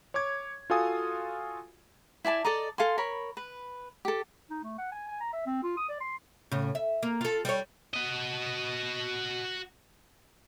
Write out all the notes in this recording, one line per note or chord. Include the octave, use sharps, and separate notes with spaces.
C#5 C#6 D6 G#6
F4 F#4 A4 F5 G#5 D#6
E4 D5 G#5 A5
A4 D5 D#5 A#5
A4 F5 G#5 C6
A#4 C#5 B5
B4
G4 A4
D#4
A3
F#5
G#5
G#5
A#5
E5
C4
F4
D#6
D5
C6
A2 C#3
E5
A#3
F4 A4
G3 C#5
F#4 D#5